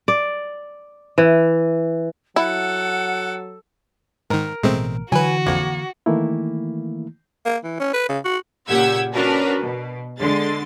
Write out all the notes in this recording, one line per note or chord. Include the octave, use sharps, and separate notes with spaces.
D5
E3
F#3 E4 A4 F#5
G#2 D#3 A#4
A1 B2 G#3 A3 C4
D3 E3 F#3 F#4 B4 G#5
A#1 F2 A#3
D#3 E3 A3 A#3 E4
A#3
E3
C#4
B4
C#3
F#4
A#2 C#3 G4 F#5 E6 G#6
C#4 D4 F#4 A#4 B4
B2
D3 G#3 C6 A6